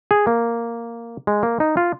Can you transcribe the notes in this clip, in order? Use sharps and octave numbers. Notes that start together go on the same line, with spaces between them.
G#4
A#3
G#3
A#3
D#4
F4